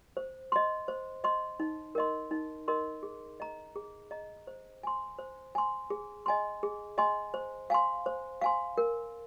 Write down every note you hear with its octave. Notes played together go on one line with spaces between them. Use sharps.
C5
D#5 C6
C5
D#5 C6
D#4
A#4 D#5 C6
D#4
A#4 D#5 C6
G#4
D#5 A#5
G#4
D#5 A#5
C5
G#5 C6
C5
G#5 C6
G#4
D#5 G#5 C6
G#4
D#5 G#5 C6
C5
F5 G#5 C6
C5
F5 G#5 C6
A#4